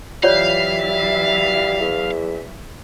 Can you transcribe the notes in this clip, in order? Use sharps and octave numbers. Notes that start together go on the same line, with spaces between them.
E3 F#3 G3 F4 C#5 D5 E5 F5
E2